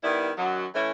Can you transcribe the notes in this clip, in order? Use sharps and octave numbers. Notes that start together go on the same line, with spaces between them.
D#3 G3 B3 E4
F#2 D#3 F#3
E3 A3 C#4 E4